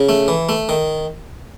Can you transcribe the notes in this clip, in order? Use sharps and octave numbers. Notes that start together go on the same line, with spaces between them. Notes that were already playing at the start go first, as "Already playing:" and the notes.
Already playing: C#3
A3
E3
A3
D#3